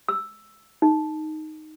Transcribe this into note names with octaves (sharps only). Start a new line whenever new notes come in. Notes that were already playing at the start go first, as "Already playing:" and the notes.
E6
D#4